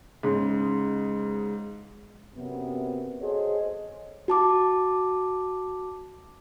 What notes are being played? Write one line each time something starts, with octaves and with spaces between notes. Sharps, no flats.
G#2 C#3
F#2 C3 B3
F#4 G#4 A4 C5 C#5 D#5
F#4 A5 D6